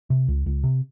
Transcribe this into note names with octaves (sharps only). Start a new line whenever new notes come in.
C3
C#2
C#2
C3